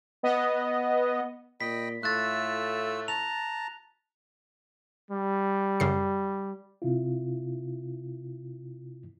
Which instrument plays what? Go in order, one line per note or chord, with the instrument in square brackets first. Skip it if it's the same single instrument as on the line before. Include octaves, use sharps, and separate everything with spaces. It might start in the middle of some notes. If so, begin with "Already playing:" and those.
[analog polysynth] B3 D#5
[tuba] A#2 [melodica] D#5 G5 B5 [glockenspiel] B6
[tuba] A2 [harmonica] A3 [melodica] F4 E6 [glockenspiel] F#6 A6
[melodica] A5 A#5 [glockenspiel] F7
[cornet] G3
[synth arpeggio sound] F#2 C#3 C7
[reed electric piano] C3 E4 F4